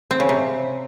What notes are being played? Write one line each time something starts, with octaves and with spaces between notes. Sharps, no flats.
C4
C#3
C3